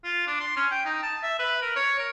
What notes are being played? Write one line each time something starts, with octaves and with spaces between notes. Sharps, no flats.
F4
D4
C6
C#4
G5
D#4
A5
E5
B4
A#4
C#5
A#4